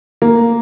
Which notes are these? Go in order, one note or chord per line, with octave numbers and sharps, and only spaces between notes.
A#3